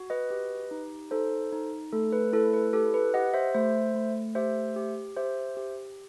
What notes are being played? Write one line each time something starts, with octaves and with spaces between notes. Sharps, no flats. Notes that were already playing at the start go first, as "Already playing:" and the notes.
Already playing: F#4
B4 D#5
G4
D#4
D#4 A4 C5
D#4
A3 A4
B4
E4 A4
B4
G4 A4
B4
G4 D#5 F#5
C5 E5
A3 C5 E5
A3
G4 C5 E5
G4
G4 C5 E5
G4